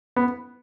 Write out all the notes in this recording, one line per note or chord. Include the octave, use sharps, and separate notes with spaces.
B3